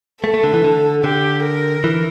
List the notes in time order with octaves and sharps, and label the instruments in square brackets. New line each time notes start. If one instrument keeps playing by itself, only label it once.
[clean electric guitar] A3 [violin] A4
[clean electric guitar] A3
D3
E3
D3
[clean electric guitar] D3 [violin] G4
[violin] A#4
[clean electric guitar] E3